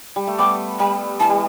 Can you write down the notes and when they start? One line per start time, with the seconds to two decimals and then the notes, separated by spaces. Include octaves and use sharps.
0.16 G3
0.27 A3
0.39 G3 B3 D6
0.79 G3 B5
1.20 E3 A5
1.30 G3